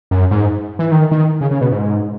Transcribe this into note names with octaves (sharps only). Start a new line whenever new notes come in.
F#2
G#2
E3
D#3
D#3
C#3
C#3
B2
G#2